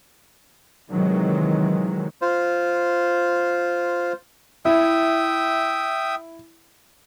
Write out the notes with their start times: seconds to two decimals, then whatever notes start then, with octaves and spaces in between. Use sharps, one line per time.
0.91 C3 D#3 E3 F#3 G#3
2.22 F4 C5
4.65 E4 E5 G5 D#6